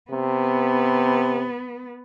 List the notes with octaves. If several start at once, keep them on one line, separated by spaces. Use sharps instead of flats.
C3 B3